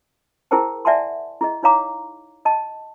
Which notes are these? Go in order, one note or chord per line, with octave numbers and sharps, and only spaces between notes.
E4 G#4 A#4 C5 G5 A5
D5 E5 F#5 G#5 A5 C6
E4 G#4 D#5
D#4 E4 C#5 F5 A#5 D6
D#5 A5